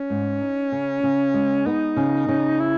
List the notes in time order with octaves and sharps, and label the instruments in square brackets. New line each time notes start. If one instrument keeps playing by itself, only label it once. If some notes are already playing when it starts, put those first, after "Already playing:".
Already playing: [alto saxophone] C#4
[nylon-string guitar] G#2
D#4
C#3
C#3
G#3
[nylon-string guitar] B3 [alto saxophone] D#4
[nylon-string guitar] C#3
C#3
[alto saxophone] E4